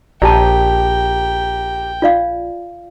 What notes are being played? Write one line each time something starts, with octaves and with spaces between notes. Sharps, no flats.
A#1 G4 D5 G5 A5 A#5
F4 D5 F5